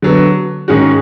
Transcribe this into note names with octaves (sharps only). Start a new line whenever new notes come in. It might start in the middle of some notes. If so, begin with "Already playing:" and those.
D3 F#3 B3
G#2 D#3 G#3 C#4 F#4